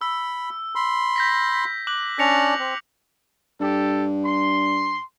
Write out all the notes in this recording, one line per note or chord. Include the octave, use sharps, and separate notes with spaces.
B5 E6
B5 C6
G6 A#6 B6
D6 F#6 F#7
C#4 D4 D5 A#6 C#7 F7
C4
G2 G4 A4
C6